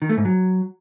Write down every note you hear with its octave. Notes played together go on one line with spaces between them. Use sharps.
D#3
A3
G#2
F#3